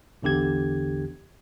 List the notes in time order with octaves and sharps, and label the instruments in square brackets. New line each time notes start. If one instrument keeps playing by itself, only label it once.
[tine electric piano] A1 E2 D3 G4 G#6